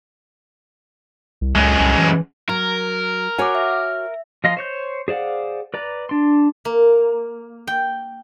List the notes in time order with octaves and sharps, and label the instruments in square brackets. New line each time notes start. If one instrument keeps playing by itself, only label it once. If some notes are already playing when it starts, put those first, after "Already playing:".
[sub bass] C2
[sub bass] C#2 [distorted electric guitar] F#2 G#3
[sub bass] C2
E3
[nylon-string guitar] F#3 [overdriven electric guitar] A#4
[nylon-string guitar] F#4 C#5 G#5 [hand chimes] F#5 D6
[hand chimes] E5
[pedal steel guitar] F3 F4 D#5 F5 C6
C5 C#5 G6
G#4 C5 D5 F5 F#5
B4 D5 A#5
D4 C6
[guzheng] A#3
G5